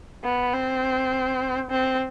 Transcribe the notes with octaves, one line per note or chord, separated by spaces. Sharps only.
B3
C4
C4